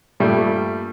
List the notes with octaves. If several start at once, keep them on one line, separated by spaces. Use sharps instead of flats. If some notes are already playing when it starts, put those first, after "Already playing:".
G2 A#2 G3 A3